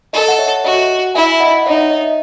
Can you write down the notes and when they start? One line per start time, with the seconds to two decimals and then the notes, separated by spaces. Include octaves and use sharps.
0.13 A4 D#5
0.28 F#5
0.39 C#5 E5
0.64 F#4 D#5 F#5
1.15 E4 E5 G#5
1.40 D#5 F#5
1.66 D#4 C#5 E5
1.91 D#5